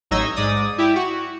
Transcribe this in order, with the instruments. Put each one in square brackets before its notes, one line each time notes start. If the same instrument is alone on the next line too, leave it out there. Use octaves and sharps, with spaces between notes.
[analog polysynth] A1 F#3 D#4 D#5 E6 G#6
G#2 D5 D#6
E4 G4
F#4